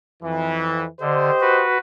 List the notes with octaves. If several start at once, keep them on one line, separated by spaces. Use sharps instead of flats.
F2 E3
D3 G4 C5 D#5
F#4 B4